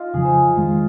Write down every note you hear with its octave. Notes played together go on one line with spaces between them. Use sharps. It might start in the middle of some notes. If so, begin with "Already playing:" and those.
Already playing: D#4 F4
F2 C#3 F3 G#4
C5
F2 D#3 G#3 F4